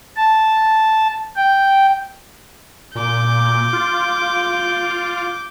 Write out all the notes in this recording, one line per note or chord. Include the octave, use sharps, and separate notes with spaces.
A5
G5
A#2 D6 G6
F4